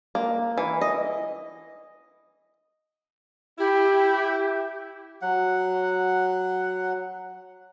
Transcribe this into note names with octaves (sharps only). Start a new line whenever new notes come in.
A#3
E3
D#5
E4 G4
F#3 F#5